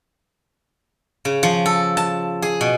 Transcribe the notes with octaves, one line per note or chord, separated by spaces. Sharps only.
C#3
F3
A4
A5
G#4
B2